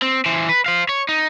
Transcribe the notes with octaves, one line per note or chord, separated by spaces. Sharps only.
C4
E3 C5
B4
C5 F5
C#5
D#4